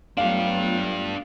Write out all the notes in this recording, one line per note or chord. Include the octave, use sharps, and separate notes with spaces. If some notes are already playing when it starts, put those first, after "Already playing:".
F#3 A3 B3 D4 F4 G4 F5